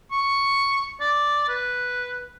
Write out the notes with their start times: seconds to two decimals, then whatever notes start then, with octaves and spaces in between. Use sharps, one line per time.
0.11 C#6
1.00 D5
1.48 B4